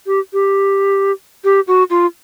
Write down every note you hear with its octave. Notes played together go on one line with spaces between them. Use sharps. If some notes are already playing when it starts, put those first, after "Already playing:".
G4
G4
G4
F#4
F4